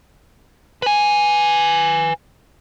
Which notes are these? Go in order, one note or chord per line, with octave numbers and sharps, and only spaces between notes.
B4 G#5